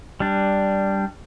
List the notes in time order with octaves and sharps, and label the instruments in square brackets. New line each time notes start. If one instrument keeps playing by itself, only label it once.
[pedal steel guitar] G3 D4